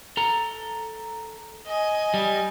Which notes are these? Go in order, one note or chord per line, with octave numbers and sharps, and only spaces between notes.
A4 A#5
D#5 G#5
G3